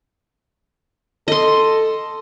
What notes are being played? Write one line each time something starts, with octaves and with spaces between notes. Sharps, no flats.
A4 D#5 C6